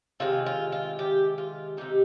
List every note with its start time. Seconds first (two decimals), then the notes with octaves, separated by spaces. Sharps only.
0.20 C3 D#3 G#3 F4
0.46 F4
0.72 F4
0.99 G4
1.38 F4
1.77 C3 D#3 A#3 D#4 G4